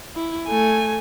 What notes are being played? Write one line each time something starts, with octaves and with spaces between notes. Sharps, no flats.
E4
A3 G#5